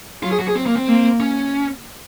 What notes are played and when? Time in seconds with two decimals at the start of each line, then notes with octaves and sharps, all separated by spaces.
0.23 F#3 F4
0.31 G#4
0.39 F#4
0.48 G#4
0.55 C4
0.66 A#3
0.76 C4
0.88 A#3
1.20 C#4